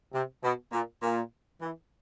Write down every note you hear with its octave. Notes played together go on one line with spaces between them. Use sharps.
C3
B2
A#2
A#2
E3